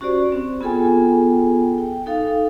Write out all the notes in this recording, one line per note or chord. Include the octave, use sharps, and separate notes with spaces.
C#4 F#4 G4 C5 D5
C4
B3 F4 G#4 A4 G5 G#5
G5
D#4 A4 F5